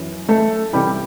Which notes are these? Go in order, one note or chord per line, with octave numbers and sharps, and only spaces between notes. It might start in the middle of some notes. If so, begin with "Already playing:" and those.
Already playing: F#2 E3
A3 A4
C2 C3 E3 G3 G4